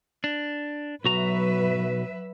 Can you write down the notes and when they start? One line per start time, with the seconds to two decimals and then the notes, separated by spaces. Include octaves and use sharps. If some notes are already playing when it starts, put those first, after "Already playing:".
0.24 D4
1.05 B1 F#3 F#4 B4 E5 A#5